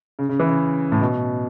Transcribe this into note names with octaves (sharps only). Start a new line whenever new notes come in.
C#3
C#3
E3
C#3
A2
B2